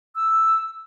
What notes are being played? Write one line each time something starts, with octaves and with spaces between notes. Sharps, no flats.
E6